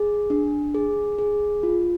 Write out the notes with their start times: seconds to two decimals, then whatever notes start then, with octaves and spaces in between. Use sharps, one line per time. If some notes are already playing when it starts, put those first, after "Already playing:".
Already playing: G#4
0.30 D4
0.75 G#4
1.19 G#4
1.63 F4